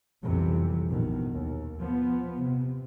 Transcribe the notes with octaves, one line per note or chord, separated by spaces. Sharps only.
B1 F2 C3 E3 G3
A#1 B2 D#3
D#2
F3 B3
C3